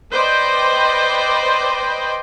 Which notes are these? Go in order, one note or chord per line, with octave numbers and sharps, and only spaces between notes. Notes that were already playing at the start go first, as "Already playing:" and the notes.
B4 C5 D5 D#5 G5